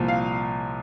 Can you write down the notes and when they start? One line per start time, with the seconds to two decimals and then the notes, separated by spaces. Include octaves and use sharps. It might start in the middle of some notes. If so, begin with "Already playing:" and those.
Already playing: C2 A#2 F3
0.08 F5